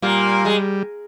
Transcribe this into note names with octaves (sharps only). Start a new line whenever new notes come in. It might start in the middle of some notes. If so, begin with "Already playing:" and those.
A#2 G3 A#3
G#3